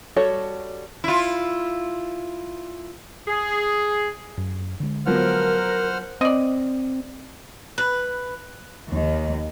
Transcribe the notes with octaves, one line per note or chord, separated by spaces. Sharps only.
G3 F#4 A4 C#5
E4 F4
G#4
F#2
D3 G#3
F3 F#3 B3 A#4 C5 F#5 F6
C4 D5 D#5
B4
D#2 D#3